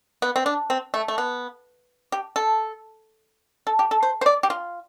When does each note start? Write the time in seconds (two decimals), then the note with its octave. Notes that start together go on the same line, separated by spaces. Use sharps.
0.22 B3
0.36 C4
0.46 D4
0.70 C4
0.94 A3
1.08 A3
1.18 B3
2.12 G4
2.36 A4
3.67 A4
3.79 G4
3.91 A4
4.03 C5
4.21 C5
4.26 D5
4.43 G4
4.50 F4